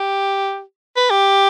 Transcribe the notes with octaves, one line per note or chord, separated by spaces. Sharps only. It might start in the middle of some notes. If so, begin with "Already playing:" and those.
Already playing: G4
B4
G4